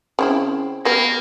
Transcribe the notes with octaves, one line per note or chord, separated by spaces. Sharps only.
C#3 C4 E4
G3 A#3 B3